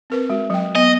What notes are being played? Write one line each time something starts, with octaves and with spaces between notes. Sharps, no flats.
C4 A#4 B4
G#3 F#4
F#3 G5
B3 D#5